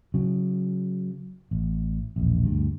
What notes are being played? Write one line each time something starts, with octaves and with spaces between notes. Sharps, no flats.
C#3 F#3
A1
E1 A#1
D2 G2